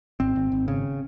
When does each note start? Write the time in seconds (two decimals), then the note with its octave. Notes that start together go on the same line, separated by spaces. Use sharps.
0.20 G#1 C4
0.36 G#1
0.52 G#1
0.68 C#3